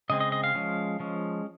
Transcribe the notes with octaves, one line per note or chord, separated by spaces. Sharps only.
C#3 G#3 C4 D#5
D#5
D#5
F5
F3 G#3 C#4
F3 G#3 C#4